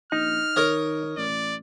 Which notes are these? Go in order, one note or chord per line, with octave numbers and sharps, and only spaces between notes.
A#1 D#4 F6
D#3 A#4 C#5 D#5
A1 D5